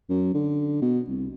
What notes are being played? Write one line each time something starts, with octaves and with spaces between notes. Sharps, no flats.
F#2
D3
B2
C2